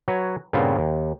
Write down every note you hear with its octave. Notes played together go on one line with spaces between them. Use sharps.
F#3 B4 C#5
G2 A#2 C#3 B3 C4 F4
D#2